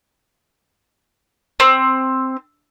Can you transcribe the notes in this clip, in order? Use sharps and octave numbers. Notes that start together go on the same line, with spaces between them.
C4